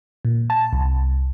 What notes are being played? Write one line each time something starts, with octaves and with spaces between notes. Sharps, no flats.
A#2
A5
C2